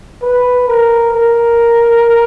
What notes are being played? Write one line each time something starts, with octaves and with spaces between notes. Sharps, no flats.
B4
A#4
A#4